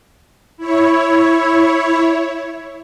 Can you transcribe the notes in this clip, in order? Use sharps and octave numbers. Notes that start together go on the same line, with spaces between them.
E4 C#5